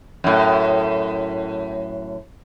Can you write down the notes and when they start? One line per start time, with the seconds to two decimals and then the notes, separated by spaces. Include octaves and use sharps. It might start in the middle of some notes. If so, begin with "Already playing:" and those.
0.24 F#2 A2